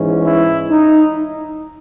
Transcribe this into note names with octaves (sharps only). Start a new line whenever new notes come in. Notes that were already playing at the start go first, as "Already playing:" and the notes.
Already playing: G#2 E3 G#3 C#4
E4
D#4